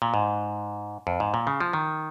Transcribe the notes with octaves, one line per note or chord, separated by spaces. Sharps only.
A#2
G#2
F2
G#2
A#2
C#3
F3
D#3